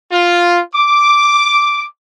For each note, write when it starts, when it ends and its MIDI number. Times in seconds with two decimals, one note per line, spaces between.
0.12 0.59 65
0.75 1.85 86